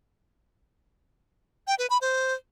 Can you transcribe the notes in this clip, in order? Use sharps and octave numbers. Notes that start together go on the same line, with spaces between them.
G5
B4
B5
C5